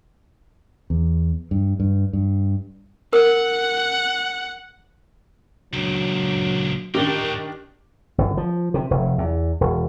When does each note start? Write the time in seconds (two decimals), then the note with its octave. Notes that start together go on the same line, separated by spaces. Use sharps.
0.90 E2
1.51 G2
1.80 G2
2.13 G2
3.13 A#4 F#5
5.73 C#2 A#2 F#3 D4
6.95 A2 D#3 D4 D#4 G4
8.18 G1
8.37 F3
8.74 C3
8.91 F1
9.18 E2
9.61 E1